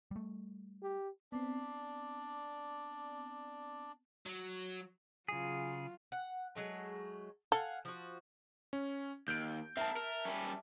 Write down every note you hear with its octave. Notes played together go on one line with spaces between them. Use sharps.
G3 A3
G4
B3 C4 D4 D5
F#3
C#3 F#3 F4 G#4
F#5
F#3 G#3 A3
A4 F5 F#5 G#5
F3 F#4
C#4
D#2 G6 D7
C4 A#4 E5 A5
A#4
G3 C#4